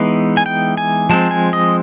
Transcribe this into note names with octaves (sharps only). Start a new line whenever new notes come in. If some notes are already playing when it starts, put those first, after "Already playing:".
Already playing: E3 G#3 B3 D#4
G#5
G5
G#5
F3 G#3 C4 A5
G#5
D#5